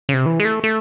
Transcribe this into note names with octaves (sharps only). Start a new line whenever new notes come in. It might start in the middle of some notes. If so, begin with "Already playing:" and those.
C#3
C3
E3
G#3
A3
A3